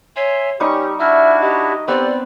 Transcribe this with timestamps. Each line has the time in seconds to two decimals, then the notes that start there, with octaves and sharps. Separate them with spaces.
0.16 C#5 E5 G#5 C6
0.60 G3 C#4 D#4 G4 C#6
1.00 D4 E4 F#4 E5 F6
1.41 G4 D#5
1.88 B3 C4 G4 A4 D5